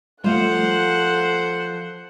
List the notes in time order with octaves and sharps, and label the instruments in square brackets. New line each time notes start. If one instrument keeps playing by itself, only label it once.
[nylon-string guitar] F3 F4 [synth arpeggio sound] G3 A3 [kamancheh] A4 F#6 [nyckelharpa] C5 F#5